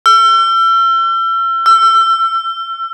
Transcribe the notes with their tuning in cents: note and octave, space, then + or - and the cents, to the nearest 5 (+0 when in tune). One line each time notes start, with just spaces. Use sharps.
E6 +40
E6 +30